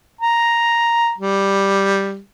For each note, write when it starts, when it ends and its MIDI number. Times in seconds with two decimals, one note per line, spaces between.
0.21 1.12 82
1.18 2.18 55